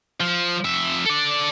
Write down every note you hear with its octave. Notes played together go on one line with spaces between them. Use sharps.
F3
F2 E5
A4 D5